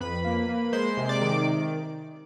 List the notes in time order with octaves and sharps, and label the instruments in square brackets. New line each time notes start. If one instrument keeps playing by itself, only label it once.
[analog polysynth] F2 B4 B5
A#3
A#3
G#3 C5 C6
C3
D5 D6
D#3